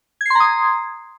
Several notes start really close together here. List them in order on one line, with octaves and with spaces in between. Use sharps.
G#6 C7 C6 A#5 D#6